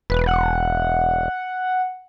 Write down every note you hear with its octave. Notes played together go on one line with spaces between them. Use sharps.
E1 B4
F#5